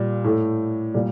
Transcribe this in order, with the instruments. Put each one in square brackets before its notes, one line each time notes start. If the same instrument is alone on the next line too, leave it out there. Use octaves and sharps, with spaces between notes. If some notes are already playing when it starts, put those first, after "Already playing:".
Already playing: [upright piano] A#2 G3
A2 A3
A#2 G3